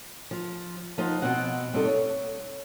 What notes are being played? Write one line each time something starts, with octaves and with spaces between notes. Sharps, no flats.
F3
F3 D#4 C5 F#5
B2 C4 F#4 F#5
G3 C4 D#4 A4
C#5